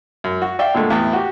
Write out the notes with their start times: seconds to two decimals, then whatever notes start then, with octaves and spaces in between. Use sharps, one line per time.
0.24 F#2
0.42 F#4
0.59 D5 E5 F5 G5
0.74 A#2 D3 G#3 A3
0.90 A1 E2 A2 E3 E5 G5
1.13 F#4 G4